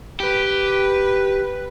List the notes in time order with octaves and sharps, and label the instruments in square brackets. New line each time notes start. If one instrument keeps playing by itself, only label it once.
[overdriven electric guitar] G4 [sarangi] B4